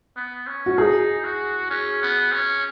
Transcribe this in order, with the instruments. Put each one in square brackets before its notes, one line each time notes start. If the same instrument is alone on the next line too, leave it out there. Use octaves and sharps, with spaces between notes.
[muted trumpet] B3
C#4
[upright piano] F#4
[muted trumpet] D#4 [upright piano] G#4
[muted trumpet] F#4
C#4
B3
C#4